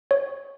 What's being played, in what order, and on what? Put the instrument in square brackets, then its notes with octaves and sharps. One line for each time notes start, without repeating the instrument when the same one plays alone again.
[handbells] C#5